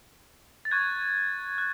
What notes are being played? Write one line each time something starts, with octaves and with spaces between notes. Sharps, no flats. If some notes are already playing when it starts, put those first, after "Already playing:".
A6
C#6 F#6 G#6
F#6